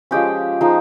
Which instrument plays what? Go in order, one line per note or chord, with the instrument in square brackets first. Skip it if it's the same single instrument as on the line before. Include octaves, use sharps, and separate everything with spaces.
[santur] F3 G#3 C#4 G4 G5
F3 G#3 D#4